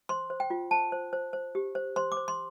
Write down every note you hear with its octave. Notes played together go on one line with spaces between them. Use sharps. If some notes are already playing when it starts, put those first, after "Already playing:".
C5 C6
C5
G5
F4
C5 A5
C5
C5
C5
G4
C5
C5 C6
D6
C5
C6